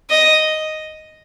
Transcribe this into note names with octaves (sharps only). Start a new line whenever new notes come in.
D#5